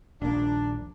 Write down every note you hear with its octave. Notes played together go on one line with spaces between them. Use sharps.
D#1 A#1 A#3 D4